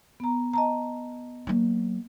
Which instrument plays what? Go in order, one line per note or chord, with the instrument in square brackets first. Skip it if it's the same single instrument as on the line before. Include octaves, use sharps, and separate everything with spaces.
[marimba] B3 A#5
D#5 A5 A#5
[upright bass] F#3 A#3